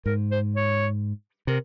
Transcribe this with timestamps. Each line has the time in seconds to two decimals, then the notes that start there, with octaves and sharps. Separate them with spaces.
0.06 G#2 A#4
0.31 C5
0.56 C#5
1.47 C3 A#4